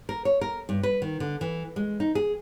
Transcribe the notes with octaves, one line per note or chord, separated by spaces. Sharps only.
A#4
C#5
A#4
G2
B4
D#3
D3
E3
G#3
D#4
G#4